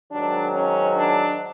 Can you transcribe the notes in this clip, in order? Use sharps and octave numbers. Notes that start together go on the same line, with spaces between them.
G#2 D#3 F#3 D4
C#4
D4